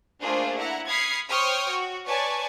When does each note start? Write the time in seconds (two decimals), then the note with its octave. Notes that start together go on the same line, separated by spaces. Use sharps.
0.20 A3 A#3 D4 F4 G#4 C5
0.57 E4 F#5 A#5
0.88 B5 D#6 F6 G#6 C7 C#7
1.28 C5 C#5 G5 C#6 D#6 F6
1.70 F#4
2.07 B4 C#5 D5 G#5 A5 C#6